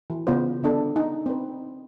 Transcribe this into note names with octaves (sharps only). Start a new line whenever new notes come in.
E3
C#3 B3 F4 C5
D3 B3 D4 A4
D#4
C4 B4